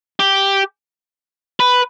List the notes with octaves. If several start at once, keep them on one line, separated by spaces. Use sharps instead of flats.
G4
B4